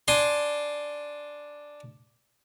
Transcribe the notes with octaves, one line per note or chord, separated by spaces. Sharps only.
D4 G#5 C6